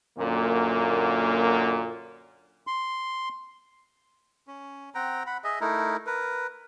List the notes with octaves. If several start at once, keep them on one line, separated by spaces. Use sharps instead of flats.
F#2 A#2 D3 A#3
C6
C#4
C4 F#5 G5 A#5
F#5 B5
G#4 D#5 E5
A3 D#4 E4 A#4
A#4 B4